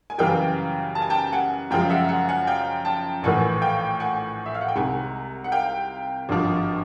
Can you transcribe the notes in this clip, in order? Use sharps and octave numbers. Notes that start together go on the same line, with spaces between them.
G#5
F#2 C#3 E3 G3 F5 G5
A5
G#5
G5 A5
F#5 G#5
F#2 C#3 F3 G#3 F5 G5
E5 F#5
F#5 G#5
F#5 G#5
F5 G5
G5 A5
A#1 A2 E3 F#5 G#5
F5 G5
F#5 G#5
E5
F5
F#5
G5
C2 C3 D#3 G#3 F#5 G#5
F#5
F5 G5
G#1 G2 D3 F3